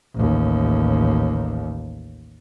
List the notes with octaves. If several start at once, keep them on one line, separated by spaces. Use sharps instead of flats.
A1 D#2